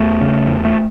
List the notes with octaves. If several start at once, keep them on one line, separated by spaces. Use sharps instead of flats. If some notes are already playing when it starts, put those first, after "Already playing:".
Already playing: E2 A3
C#3
E2
A3